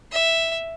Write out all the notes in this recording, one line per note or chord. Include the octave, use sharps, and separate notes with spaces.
E5